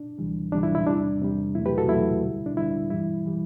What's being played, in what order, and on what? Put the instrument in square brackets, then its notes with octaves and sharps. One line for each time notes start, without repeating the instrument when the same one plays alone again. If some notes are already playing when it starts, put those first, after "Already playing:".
Already playing: [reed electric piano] D4
D2 C3 E3 G3
D2 C3 E3 G3 D4
E4
E4
E2 C3 G3 D4
E2 C3 G3
E2 C3 F#3 A3 E4
G4 B4
F#4 A4
E2 C3 F#3 A3 E4
D2 D3 G3
D4
D2 D3 G3 E4
G2 E3 G3 E4
E3 G3